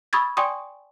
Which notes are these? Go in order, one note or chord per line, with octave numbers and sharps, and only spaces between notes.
B5 C#6 D#6 E6 G#6 A6
D5 G5 G#5 C6 C#6 D#6